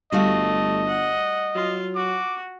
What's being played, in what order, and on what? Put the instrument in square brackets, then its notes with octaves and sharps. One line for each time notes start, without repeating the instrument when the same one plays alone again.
[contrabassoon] G1 [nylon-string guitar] G3 F#4 F5 [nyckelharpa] A3 [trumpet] D#5
[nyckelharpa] F#5
[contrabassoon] F#3 [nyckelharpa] F4
[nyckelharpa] F#4 [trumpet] D6